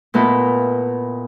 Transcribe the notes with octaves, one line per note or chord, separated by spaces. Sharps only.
A#2 A3 B3 D#4 E4